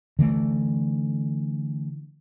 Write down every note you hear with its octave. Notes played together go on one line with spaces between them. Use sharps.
D3 E3 A3